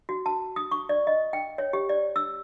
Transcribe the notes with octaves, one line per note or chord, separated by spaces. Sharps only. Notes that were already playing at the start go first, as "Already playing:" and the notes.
F#4
A5
D#6
C#6
D5
D#5
G5
C#5
G4
D5
E6